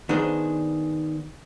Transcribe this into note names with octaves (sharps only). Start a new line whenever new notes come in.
D#3 B3 D4 G#4 C5